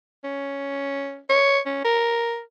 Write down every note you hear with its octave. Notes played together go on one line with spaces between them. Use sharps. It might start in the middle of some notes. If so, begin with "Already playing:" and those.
C#4
C#5
C#4
A#4